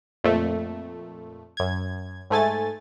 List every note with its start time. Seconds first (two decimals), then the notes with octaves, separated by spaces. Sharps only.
0.24 F2 A#2 A3
1.57 F#2 G#6
2.30 G#2 A3 G#5 A6